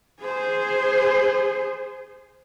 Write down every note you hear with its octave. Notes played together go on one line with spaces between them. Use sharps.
G#4 C5